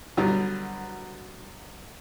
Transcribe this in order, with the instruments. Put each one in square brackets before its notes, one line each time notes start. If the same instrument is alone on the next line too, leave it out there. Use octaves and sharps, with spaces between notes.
[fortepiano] B2 D3 F#3 G3